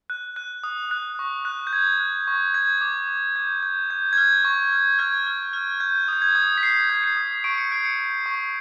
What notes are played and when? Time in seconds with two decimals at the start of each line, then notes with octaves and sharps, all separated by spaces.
0.10 F#6
0.36 F#6
0.64 D#6
0.91 F#6
1.19 C#6
1.45 F#6
1.67 G6
1.73 F#6 G#6
2.00 F#6
2.27 C#6
2.54 G6 G#6
2.81 D6
3.09 D6
3.36 G6
3.63 G6
3.90 G6
4.13 G#6
4.17 F6 G6
4.45 C#6
4.72 F6
4.99 F6 G#6
5.27 F6
5.53 F6
5.80 G6
6.08 D#6 G6
6.22 G#6
6.35 D#6
6.57 B6
6.63 D#6 C7
6.90 G6
7.04 C7
7.17 D#6
7.44 C#6 D7
7.58 C#7
7.71 G6 C7
7.85 C#7
7.99 G6
8.26 C#6